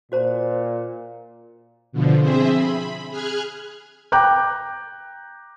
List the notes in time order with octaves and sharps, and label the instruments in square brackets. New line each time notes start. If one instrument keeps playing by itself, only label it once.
[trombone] A#2 [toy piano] F#4 C5 A#5
[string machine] B2 D3 F3
C4 G#4 C5 E5
B5
G#4 F6 F#6 G#6
[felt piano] G5 A#5 D6 F#6 G6